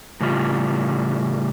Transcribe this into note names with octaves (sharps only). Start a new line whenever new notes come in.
A2 C#3 G3 F4